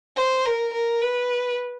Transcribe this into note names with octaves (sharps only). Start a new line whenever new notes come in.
C5
A#4
A#4
B4